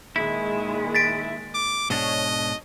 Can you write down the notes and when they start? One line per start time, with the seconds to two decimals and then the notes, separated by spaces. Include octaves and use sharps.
0.16 A#2 D#3 G#3 E4
0.95 A6 B6 D7
1.55 D6
1.90 G#2 B2 D4 C#5 D#5